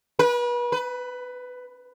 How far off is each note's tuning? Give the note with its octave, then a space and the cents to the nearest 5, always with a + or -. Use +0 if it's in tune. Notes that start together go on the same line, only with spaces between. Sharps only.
B4 -35
B4 +15